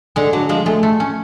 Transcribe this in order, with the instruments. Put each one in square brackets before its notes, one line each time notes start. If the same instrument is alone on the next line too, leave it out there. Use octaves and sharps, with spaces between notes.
[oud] D3 [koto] G#3
[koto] D3 [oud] F#3
[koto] F3 [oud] G#3
[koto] G#3 [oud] A3
[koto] A3
C#4